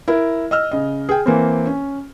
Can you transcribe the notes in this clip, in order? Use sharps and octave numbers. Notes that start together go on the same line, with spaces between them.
E4 A#4
D#5 E6 F6
C#3 D#5
G#4 G5
E3 A#3 C4
C#4